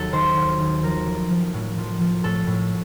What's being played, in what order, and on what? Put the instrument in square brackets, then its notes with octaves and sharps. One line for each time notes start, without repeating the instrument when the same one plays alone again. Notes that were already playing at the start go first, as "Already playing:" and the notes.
Already playing: [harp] D#2 F#3 A4
D#3 C5
D#2
D#2
F3 A#4
F3
F3
A2
F3
F3
A2 A4
A2